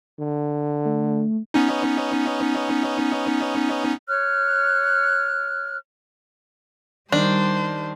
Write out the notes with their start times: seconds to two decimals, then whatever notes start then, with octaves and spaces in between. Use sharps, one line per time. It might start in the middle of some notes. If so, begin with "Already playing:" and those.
0.19 D3
0.85 A3
1.54 B3 C#4 D#4
4.08 C#5 F6 F#6
7.12 D#3 G3 D4 C5